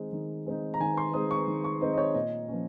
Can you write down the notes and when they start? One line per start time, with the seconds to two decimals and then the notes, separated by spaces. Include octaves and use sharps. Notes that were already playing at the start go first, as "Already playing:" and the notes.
Already playing: D#3 G#3 C4 D#4
0.13 D#3
0.46 G#3 C4 D#4
0.74 A#5
0.80 D#3 G#5
0.97 C6
1.13 G#3 C4 D#4 D#6
1.31 C#6
1.48 D#3
1.64 C#6
1.81 G#3 C4 D#4 D#5
1.93 D#5
1.98 C#5
2.15 A#2 D#5
2.48 F3 A#3 C#4